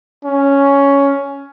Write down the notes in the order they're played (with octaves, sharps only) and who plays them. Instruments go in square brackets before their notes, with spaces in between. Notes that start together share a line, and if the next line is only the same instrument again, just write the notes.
[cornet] C#4